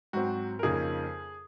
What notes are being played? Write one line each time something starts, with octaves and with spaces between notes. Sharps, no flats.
G#2 F#3 C4 F#4
A#4
F2 C#3 F3 A#3 D#4 G#4